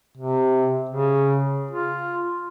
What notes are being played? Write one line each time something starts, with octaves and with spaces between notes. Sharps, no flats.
C3
C#3
F4